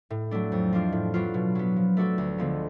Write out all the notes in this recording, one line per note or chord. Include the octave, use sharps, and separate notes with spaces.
A2
F#3 A3 D4
F2
F3 G#3 D4 F4
A2
F#3 B3 D4 F4
B2
F#3 B3
F3
A3 D4 F#4 A4
D2
D3 F3 G#3 B3